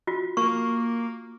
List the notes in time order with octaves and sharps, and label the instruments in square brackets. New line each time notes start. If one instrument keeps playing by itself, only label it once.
[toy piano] F4 F#4
[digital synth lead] A#3 [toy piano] C#6